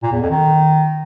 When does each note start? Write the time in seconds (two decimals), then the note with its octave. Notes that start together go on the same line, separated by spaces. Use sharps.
0.03 A#2
0.12 E2
0.21 F2
0.30 D#3